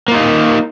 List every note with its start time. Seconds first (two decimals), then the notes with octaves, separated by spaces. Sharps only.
0.08 A#3
0.11 F4
0.15 D#4